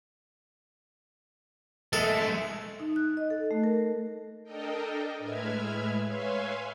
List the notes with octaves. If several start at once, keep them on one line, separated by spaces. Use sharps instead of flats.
G#3 A3 A4
D#4
F#6
D#5
A4
A3
A#4
D4 A4 A#4 D#5 G5
A2 G#3 B4 E5 F6 G#6
B4 C#5 E5 F5 G#5 C6